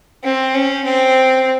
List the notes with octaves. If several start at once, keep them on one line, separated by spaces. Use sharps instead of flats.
C4
C#4
C4